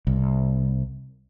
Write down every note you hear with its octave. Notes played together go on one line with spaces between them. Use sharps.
C2